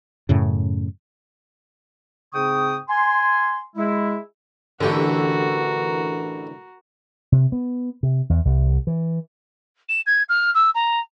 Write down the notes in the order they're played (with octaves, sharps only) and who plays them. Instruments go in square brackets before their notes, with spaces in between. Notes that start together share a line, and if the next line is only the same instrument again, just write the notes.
[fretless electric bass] F#2 A2 C#3
[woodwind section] G#2 C#3 C4 G5 C#6 D#6
G#5 C6
G#3 E4
[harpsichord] A1 A2 G4 [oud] D3 E3 [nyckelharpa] F#4 A#4
[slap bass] C3
B3
C3
E2
C2
E3
[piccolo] E7
G#6
F6
E6
A#5